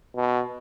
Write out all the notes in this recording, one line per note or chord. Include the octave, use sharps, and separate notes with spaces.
B2